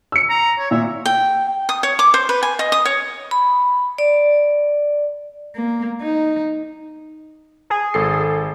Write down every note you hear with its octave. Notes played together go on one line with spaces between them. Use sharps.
E6 C#7
A#5
C#5
A#2 E5
G5
D#6
C#5
D6
C5
B4
G#5
D#5
D#6
C#5
B5
D5
A#3
D#4
G#4
G#1 A4 C7